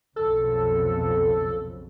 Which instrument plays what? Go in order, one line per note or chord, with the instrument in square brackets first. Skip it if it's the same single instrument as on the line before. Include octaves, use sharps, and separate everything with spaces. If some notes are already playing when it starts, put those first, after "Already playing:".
[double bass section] B1 F2 C#3 [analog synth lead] A4